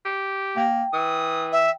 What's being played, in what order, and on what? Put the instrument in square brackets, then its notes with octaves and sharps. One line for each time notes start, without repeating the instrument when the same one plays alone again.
[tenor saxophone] G4
[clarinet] A#3 [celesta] G5
[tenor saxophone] E3 [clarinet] D#6
[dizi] E5